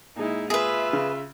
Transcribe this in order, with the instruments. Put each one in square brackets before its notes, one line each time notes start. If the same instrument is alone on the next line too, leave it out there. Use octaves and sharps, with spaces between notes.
[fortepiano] A#2 G#3 [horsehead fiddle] D#4 E4
[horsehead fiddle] F4 E5 [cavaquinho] G#4 B4
[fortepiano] C#3